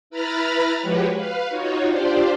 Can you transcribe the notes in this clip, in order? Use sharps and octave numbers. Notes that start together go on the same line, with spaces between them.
E4 B4 A#5 B5 F6 A6
F3 G#3 F#4 G4 B4 C#5
B4 F5
D#4 F4 F#4 C#5
D4 F4 G4 C5 D5